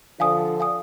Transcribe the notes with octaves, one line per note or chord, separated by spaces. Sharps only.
D3 F3 F5 G#5 D#6
F5 G#5 D#6